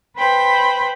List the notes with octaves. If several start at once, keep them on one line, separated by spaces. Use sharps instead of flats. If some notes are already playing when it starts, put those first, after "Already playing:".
B4 C5 G5 B5